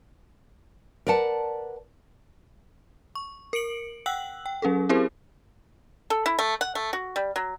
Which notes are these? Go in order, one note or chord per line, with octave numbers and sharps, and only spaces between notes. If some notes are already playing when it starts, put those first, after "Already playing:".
A#4 B4 D5 F#5 A5
C#6
A#4 C#7 D7 F#7
F#5 G5 E6 F#6 F#7
G5
F#3 C#4 G#4 A4
C4 E4 G4 G#4 A#4 C5
A4
E4
A3
F#5
A3
F#4
G3
F#3